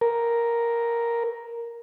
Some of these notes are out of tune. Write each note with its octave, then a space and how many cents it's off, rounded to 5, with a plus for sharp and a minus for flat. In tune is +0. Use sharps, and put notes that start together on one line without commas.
A#4 +5